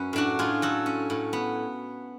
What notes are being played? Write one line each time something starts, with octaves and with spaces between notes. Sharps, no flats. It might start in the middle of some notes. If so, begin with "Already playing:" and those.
Already playing: F#2 C#4 B4
A2 D4 F#4
A2 F4 G#4
F#3 F#4 A4
C#4
A2
B3